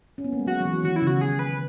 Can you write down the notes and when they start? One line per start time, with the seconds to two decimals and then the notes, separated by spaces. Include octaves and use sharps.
0.18 C#4
0.24 B3
0.33 A#3
0.39 G#3
0.46 F#3 F#4
0.60 F#3
0.65 E3
0.83 D#3 F#4
0.96 E4
1.02 C#3 F#4
1.21 G#4
1.39 B4